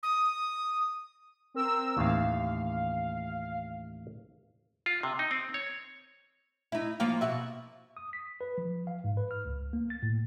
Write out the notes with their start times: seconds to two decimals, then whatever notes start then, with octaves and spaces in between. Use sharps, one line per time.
0.03 D#6
1.54 C4 A#4 E6
1.97 A1 D#2 F5
4.86 F4
5.03 C3
5.19 D#4
5.31 C4
5.54 C#5
6.72 D#4 E4
7.00 F3 A#3 F4
7.21 B2 F#4 E5
7.97 D#6
8.13 B6
8.41 B4
8.58 F3
8.87 F5
9.04 G#2
9.17 B4
9.31 F6
9.45 C#2
9.73 A#3
9.90 A6
10.03 A2